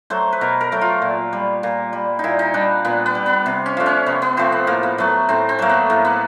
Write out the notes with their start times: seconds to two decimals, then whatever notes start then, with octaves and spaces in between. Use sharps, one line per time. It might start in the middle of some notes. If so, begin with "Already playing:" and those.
0.10 F#3 A3 C5
0.32 B4
0.41 B2 A#4
0.61 A#4
0.72 F#3 A3
0.81 F4
1.02 A#2
1.33 G3
1.63 A#2
1.93 G3
2.19 A#2 D#4 E4
2.39 D#4
2.54 G3 D4
2.85 A#2 B3
3.06 B3
3.15 G3
3.26 B3
3.46 C3
3.66 C#4
3.77 F3 A3 D4
3.86 C#4
4.06 C3 B3
4.22 B3
4.37 F3 A3 C4
4.52 B3
4.67 A2 A#3
4.83 B3
4.98 F#3 A3 B3
5.29 A2 C4
5.49 C4
5.59 F#3 A3 A#3
5.69 B3
5.90 A2 A#3
6.05 B3